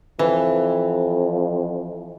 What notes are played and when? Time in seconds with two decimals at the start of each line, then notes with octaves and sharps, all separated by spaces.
0.19 F2 E3